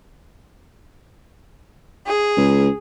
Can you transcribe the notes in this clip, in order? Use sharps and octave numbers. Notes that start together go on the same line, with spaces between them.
G#4
C#2